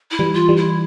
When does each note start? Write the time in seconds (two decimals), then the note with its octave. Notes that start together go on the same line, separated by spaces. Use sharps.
0.11 E4
0.19 E3 G3
0.34 F4
0.49 E3 G3
0.57 E4